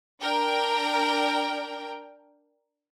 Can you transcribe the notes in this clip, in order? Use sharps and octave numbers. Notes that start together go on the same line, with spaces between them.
D4 A#4 G5